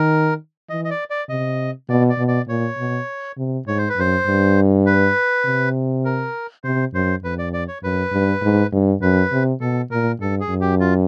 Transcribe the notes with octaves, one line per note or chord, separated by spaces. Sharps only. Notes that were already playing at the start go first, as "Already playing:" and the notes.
Already playing: D#3 A#4
E3 D#5
D#5
D5
D5
C3 D#5
B2 D5
D5
B2
D5
A#2 C#5
B2
C3
G#2 C#5
C5
B4
F#2 C5
G2
B4
C3
A#4
C3 C5
F#2 C5
F2 B4
D5
D5
C#5
F#2 B4
G2
G#2
G2
F#2 B4
C3
B2 A4
A#2 A#4
G2 A4
G#4
F#2
G4
F4